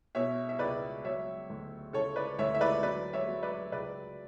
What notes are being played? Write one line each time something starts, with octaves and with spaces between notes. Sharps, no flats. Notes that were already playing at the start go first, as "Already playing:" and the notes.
B2 C#5 E5
E5
C#2 B4 D5
F#3 C#5 E5
D2
C#3 A4 C#5
B4 D5
D2 C#5 E5
E5
B4 D5
F#3 B4 D5
C#5 E5
F#3
B4 D5
C#2 B4 D5